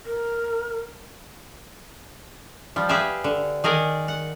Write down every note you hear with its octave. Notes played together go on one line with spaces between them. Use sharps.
A#4
F3 G3
G4 G#4 B4 E5 F5 G#5
D3
D#3 G#4 A#4 D5 F#5
F#5